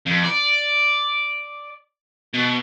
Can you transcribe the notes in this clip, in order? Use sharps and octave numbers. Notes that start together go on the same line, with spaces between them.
F2
D5
B2